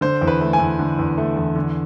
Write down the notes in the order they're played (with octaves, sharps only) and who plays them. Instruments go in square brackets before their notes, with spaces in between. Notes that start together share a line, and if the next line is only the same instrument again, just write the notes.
[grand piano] D3 C5
E2
B4
A3
G#5
E2
D3
E2
A3
E2
D3